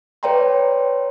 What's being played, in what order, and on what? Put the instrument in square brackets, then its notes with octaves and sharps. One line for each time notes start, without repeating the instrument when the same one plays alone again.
[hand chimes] B4 C#5 D5 G5 A#5 C6